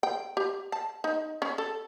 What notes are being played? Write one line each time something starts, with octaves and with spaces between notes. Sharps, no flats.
G5
G4
A5
D#4
C#4
A4